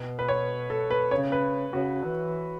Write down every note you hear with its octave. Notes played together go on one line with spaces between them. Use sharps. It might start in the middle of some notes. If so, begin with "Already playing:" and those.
Already playing: B2
B4
C#5
A4
B4
C#3 C#5
B4
C#3 F#4
E3